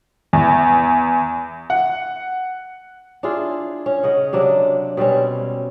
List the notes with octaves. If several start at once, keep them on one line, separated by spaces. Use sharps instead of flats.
E2
F#5
D4 E4 F4 G#4
C#4
C#3 D#5 F#5
C3 F#3 D4 D#5
B2 G3 C4 C#4